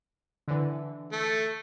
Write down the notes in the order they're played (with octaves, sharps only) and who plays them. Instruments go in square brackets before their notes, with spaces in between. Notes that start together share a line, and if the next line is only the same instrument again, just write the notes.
[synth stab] D3 E3
[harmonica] A3